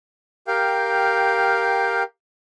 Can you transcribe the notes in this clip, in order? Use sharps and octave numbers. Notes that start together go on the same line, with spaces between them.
G4 A#4 F5 G5